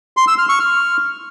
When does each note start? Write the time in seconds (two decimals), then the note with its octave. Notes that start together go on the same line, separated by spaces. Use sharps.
0.17 C6
0.28 E6
0.38 F6
0.49 C#6
0.59 F6